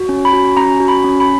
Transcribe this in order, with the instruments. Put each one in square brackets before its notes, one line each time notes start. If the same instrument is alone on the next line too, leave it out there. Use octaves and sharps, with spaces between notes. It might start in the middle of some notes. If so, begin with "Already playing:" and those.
Already playing: [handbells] F#4
C#4
B5
F#4
C#4 A#5
F#4
B5
C#4
B5